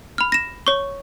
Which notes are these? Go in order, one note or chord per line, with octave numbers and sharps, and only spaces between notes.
B5 F6
A#6 E7
C#5 C#6